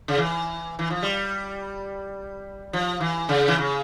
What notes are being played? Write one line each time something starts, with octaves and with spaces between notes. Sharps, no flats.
C#3
E3
E3
F3
G3
F3
E3
C#3
E3
C#3